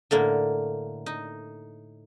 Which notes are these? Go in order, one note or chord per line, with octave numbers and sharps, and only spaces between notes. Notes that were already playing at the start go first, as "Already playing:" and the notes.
A2 D3 A#3
D#4